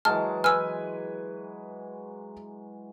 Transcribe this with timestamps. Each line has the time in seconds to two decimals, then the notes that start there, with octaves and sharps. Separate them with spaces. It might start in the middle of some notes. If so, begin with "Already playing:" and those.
0.05 E3 F#3 G#3 A5 F6
0.44 B4 G#5 E6 F6